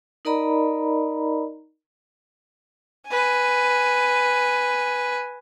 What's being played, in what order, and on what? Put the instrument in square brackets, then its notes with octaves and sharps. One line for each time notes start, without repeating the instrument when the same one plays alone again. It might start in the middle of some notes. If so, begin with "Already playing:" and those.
[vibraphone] D#4 A#4 D5 D#5 A#5 B5
[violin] B4 G#5